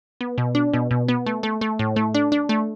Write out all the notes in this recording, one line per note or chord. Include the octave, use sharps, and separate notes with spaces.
B3
B2
D4
B2
B2
B3
A3
A3
A3
A2
A3
D4
D4
A3